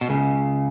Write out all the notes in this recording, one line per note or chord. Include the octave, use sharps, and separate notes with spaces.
B2
C#2 C#3